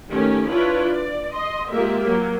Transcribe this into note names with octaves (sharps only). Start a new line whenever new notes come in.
D#3 A3 C#4 G4
D4 E4 F4 B4 C#5
D5
D#5 C6
G#3 A#3 F4 G4 E5
F#3 A#3